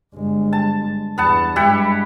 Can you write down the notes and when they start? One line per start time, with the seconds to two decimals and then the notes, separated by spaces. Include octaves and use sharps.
0.15 G1 G#3
0.53 A5
1.18 E2 G2 B3 F#5 A5
1.56 G2 G#3 E4 G4 F#5